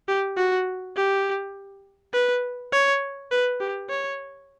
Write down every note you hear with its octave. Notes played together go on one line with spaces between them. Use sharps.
G4
F#4
G4
B4
C#5
B4
G4
C#5